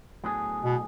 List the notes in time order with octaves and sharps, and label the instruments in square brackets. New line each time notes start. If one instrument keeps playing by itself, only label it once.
[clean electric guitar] A2 F#3 B3 D4 G#4
[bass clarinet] B2